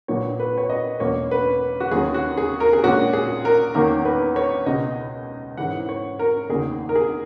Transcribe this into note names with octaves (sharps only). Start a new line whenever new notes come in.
A#1 A#2 F#3 B3 C#5
B4
C#5
D#5
E1 E2 B2 A#3 C#4 C#5
B4
F#4
D#2 D#3 F#3 C#4 G#4
F#4
G#4
A#4
G#4
A#1 A#2 G#3 C#4 F#4
G#4
A#4
E2 D#3 A#3 C#4 A#4
B4
C#5
C#2 B2 G#3 D#5
G#2 E3 G#3 C#4 F#5
C#5
A#4
F#1 E2 D#3 G#4
A#4
G#4